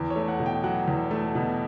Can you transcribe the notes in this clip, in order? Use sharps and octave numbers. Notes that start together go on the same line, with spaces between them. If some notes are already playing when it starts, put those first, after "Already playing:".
Already playing: E2
C#5
A3
F#5
B2
G5
F#3 F#5
E2
A3
B2